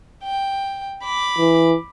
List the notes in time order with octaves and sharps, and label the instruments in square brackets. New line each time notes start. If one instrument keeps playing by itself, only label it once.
[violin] G5
B5 D6
[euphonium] E3